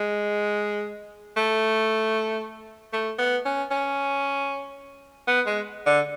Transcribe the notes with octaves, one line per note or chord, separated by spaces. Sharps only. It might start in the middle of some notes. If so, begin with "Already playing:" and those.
Already playing: G#3
A3
A3
B3
C#4
C#4
B3
G#3
D3